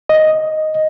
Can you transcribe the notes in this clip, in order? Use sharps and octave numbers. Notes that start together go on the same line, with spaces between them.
D#5